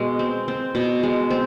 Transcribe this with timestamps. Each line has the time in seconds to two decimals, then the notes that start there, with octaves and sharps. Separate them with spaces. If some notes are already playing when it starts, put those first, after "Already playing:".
Already playing: B2 G#3
0.19 C4
0.48 C4
0.75 B2
1.03 G#3
1.30 C4